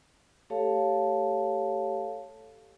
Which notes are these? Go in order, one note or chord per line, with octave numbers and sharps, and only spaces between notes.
A3 G4 A4 C#5 F5 A5